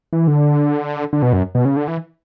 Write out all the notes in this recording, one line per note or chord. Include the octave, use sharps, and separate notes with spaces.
E3
D3
D3
B2
F#2
B2
C#3
D3
E3